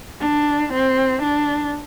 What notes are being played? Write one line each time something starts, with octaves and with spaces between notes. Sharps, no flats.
D4
C4
D4